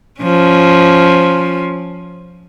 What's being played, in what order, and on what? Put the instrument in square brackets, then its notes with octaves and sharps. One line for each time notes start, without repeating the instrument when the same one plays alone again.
[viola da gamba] F3 C#4